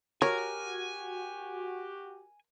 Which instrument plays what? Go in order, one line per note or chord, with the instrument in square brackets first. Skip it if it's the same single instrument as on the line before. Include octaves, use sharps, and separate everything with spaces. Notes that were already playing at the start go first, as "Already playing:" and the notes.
[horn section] F#4 G4 [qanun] A#4 [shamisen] C#5 [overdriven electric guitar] G#5